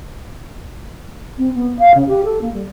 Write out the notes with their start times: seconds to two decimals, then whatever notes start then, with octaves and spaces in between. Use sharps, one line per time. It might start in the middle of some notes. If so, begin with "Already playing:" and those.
1.38 C4
1.54 B3
1.79 F5
1.94 C#3
2.08 G4
2.25 A4
2.41 A#3
2.53 G3